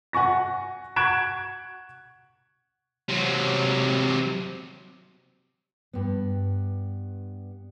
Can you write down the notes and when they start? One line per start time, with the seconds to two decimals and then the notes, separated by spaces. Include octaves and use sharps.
0.13 F#5 G#5 C#6 A#6
0.96 F#5 C#6 F#6 G#6 D7 E7
3.09 C3 F#3
5.93 G2 B3